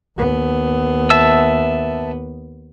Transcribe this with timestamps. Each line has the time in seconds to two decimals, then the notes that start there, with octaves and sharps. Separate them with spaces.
0.17 D#2 B3
1.10 E5 A5 E6